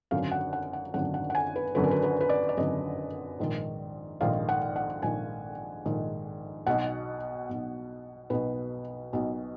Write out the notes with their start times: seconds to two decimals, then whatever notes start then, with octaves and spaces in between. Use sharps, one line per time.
0.11 G#1 F#2 D3 F5
0.32 F#5
0.53 F#5
0.73 F#5
0.94 G#1 F#2 D3 F#5
1.14 F#5
1.30 F#5
1.35 G#5
1.56 B4
1.75 G#1 F#2 D3 B4
1.84 A#4
1.91 B4
2.03 B4
2.20 B4
2.29 D5
2.49 D5
2.57 G#1 F#2 D3 D#5
3.40 A#1 G#2 D#3
4.21 A#1 G#2 D#3 F5
4.49 F#5
4.76 F#5
5.02 A#1 G#2 D#3 G#5
5.85 A#1 G#2 D#3
6.67 B1 B2 F#5
7.49 B1 B2
8.30 B1 B2 B4
9.13 B1 B2